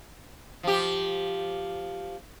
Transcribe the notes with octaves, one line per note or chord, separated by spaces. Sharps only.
F3 G4